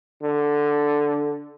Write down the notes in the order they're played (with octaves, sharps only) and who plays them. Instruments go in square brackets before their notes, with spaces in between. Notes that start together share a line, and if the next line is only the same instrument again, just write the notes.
[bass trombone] D3